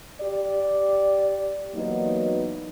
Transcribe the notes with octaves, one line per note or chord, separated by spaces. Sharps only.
G4 D5
E3 F#3 A#3 B3 D#4